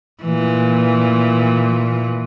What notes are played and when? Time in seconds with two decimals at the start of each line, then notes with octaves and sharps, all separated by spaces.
0.23 A#2 E3